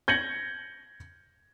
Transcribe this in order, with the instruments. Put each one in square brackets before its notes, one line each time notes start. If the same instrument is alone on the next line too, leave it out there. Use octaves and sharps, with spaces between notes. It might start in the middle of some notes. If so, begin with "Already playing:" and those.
[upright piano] G6 G#6 A#6 C#7 F#7